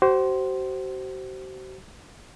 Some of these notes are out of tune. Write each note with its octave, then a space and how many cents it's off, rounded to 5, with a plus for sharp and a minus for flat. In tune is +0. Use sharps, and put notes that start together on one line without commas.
F#4 +45 C5 +0